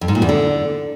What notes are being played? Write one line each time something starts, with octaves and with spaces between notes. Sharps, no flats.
F2
G#2
A#2
E2
D3